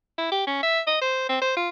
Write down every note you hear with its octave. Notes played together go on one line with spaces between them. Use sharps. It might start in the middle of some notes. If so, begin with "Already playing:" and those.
E4
G4
C#4
E5
D#5
C5
C4
C5
F4